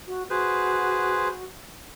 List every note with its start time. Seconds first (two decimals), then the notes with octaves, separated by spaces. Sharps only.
0.07 F#4
0.30 F#4 G#4 B4 C5